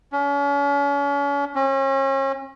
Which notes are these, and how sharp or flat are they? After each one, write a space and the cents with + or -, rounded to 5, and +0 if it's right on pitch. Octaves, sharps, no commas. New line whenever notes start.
C#4 +40
C#4 -35